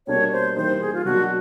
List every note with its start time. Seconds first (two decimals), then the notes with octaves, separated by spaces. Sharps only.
0.07 B2 G3 A#3 D4 C#5
0.32 C5
0.56 E3 G3 A#3 D#4 C5
0.81 G#4
0.93 F4
1.05 B2 F#3 A#3 D4 F#4